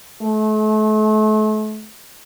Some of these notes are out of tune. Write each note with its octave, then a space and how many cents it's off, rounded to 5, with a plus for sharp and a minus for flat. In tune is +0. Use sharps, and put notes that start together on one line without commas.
A3 -35